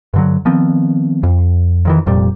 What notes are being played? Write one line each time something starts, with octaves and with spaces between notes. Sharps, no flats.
G2 D3 F#3
D#3 F3 B3 C4
F2
F2 D#3 E3
F1 F2 A#2 G3